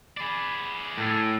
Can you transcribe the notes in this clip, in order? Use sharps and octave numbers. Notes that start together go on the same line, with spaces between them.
G#4 D5 B5
A2 A4